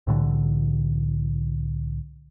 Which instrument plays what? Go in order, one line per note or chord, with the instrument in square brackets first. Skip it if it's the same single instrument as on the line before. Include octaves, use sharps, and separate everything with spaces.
[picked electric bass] C2 A2 D3 E3